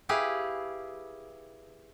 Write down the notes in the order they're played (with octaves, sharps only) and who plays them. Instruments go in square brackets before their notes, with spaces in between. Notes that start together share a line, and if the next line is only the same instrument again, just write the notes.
[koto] E4 G4 G#4 B4 F5